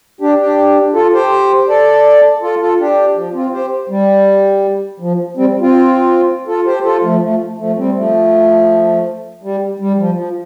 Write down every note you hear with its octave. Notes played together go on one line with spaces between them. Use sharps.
D4 G4
D4 G4
F4 A4
G4 C5
A4 D5
F4 A4
F4 A4
D4 G4
F3
C4 F4
G4 C5
G3
F3
G3 C4
C4 F4
F4 A4
G4 C5
F4 A4
F3 A3
F3 A3
F3 A3
G3 C4
F3 A3
G3
G3
F3
F3